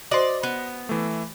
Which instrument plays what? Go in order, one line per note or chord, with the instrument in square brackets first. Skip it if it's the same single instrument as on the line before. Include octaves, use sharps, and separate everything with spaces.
[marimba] F#4 C5 [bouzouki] D5 [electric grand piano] D#5 C6
[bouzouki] B3
[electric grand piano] E3 A3